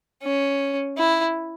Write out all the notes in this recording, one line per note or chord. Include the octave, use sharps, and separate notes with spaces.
C#4
E4